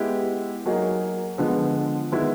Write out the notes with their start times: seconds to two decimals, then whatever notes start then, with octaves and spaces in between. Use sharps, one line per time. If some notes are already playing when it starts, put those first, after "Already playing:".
Already playing: G#3 B3 E4 G4
0.66 F#3 A#3 D#4 G#4
1.38 D3 F3 G#3 B3
2.12 D#3 G#3 B3 E4